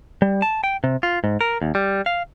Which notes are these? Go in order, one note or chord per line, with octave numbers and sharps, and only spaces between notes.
G3
A5
G5
C3
F4
G#2
A#4
D#2
G3
F5